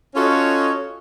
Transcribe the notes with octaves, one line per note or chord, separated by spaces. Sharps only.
C#4 F4 F#4 A4 C#5 D#5